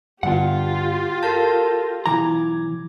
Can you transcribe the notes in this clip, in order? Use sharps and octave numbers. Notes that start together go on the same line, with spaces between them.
G2 D3 B3 F4 G4 F#5
A4 A#4 A5 G6 A#6
B1 E3 A#5 D6 G#6